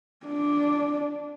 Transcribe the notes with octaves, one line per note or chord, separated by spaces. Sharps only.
D4